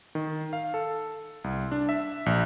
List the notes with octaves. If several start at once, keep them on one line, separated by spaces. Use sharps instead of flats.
D#3
F5
A4
C2
D4
E5
A#1